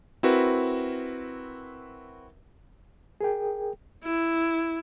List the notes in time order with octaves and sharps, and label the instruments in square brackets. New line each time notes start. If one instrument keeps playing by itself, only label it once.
[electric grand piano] C4 E4 F#4 A#4 B4
[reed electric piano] G#4 A#4 G5
[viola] E4